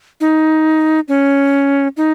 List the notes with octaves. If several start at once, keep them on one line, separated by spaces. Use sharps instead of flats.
D#4
C#4
D#4